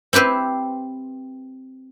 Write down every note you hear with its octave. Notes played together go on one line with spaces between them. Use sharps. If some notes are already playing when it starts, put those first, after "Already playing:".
C4 E4 G4 B4 C5